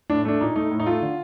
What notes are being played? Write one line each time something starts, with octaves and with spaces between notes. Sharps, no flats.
A2 D4
A3 D4
A#2 D#4
A3 D#4
A2
D#4
A3 F4
D3